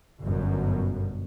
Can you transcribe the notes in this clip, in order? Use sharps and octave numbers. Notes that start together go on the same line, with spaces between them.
G1 F#2 B2